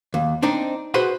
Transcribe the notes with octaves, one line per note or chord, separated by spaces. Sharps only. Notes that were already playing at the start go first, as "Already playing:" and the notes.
D#2
C4 D4 D#4
F#4 G#4 B4 C5 F#5